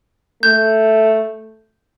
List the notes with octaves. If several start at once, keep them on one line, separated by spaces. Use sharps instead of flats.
A3 G6